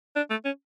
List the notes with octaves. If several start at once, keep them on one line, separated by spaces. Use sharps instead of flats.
D4
A3
C#4